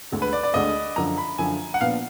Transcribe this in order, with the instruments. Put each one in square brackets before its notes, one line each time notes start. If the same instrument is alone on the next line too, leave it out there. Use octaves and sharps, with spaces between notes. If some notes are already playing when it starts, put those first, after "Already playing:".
[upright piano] D2 D3 G#3
[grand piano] B4
D5
D5
[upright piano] D2 D3 G#3 [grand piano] D#5
[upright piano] F#2 D3 F3 [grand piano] A#5
[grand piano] B5
[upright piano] F#2 D3 F3 [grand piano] G#5
[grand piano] F#5
[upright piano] A#2 F3 B3 D4 [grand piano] F5